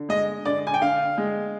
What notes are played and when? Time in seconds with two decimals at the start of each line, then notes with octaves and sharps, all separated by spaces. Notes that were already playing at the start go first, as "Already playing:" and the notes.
Already playing: D3
0.09 G#3 D#5
0.45 D3 D5
0.67 G#5
0.74 G5
0.81 D3 F5
1.18 G#3